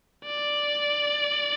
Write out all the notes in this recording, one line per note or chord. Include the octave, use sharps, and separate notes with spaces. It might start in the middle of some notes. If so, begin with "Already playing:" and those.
D5